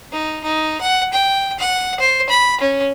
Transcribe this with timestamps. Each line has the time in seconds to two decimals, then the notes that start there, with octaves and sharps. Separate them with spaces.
0.12 D#4
0.44 D#4
0.81 F#5
1.13 G5
1.59 F#5
2.00 C5
2.29 B5
2.60 C#4